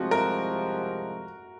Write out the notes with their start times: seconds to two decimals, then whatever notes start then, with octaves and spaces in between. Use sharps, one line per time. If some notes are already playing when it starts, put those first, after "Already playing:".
Already playing: C2 C3 F3 G#3 F#4
0.11 A#4